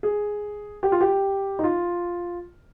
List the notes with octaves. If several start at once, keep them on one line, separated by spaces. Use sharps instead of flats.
G#4
G4
F4
G4
D#4
F4